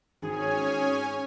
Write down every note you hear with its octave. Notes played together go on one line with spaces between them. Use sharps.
G#1 C#4 G#4 C#5 G#5